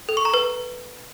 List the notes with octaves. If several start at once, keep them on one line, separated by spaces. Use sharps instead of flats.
A4
C#6
A#5
B4